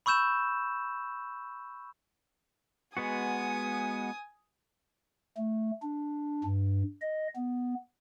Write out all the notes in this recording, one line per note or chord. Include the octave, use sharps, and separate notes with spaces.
B5 C#6 E6 G6 E7
G#3 B3 F#4 G#5 D#6
A3
D4
G2
D#5
B3